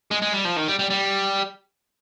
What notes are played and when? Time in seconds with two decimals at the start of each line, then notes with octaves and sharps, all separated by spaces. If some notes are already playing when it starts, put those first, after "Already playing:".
0.11 G#3
0.22 G#3
0.33 G3
0.45 F3
0.56 D#3
0.68 G3
0.79 G3
0.91 G3